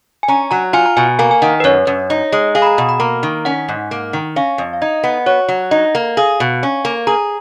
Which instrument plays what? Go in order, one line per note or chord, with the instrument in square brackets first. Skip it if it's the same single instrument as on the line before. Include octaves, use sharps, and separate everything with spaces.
[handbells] G#5
[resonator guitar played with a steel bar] C#4 [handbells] A#5
[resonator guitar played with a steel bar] F#3 [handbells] A#5
[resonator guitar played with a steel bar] F4 [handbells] G#5
[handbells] A#5
[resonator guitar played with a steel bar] B2 [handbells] G#5
[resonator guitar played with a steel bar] A#3 [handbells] G#5
[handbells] G#5
[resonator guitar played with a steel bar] D#3 [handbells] F#5
[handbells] B4
[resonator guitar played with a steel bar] F#2 [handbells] C#5
[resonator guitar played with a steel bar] F#2
D#4
G#3
[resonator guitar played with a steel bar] G#4 [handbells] F5
[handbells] B5
A#5
[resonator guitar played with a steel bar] B2 [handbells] B5
[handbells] B5
[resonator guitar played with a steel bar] A#3 [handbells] A#5
[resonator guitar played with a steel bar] D#3
[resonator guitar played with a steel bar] C#4 [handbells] F#5
[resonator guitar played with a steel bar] G#2
A#3
D#3
[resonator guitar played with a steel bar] C#4 [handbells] F5
[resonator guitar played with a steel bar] F2
[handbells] F5
[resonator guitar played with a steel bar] D#4 [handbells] D#5
[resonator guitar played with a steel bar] B3
[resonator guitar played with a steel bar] F#4 [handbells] C#5
[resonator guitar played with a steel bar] F#3
[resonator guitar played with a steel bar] D#4 [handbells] D#5
[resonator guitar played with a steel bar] A#3
[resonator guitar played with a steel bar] G#4 [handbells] F5
[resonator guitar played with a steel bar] B2
C#4
A#3
[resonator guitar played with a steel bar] G#4 [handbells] A#5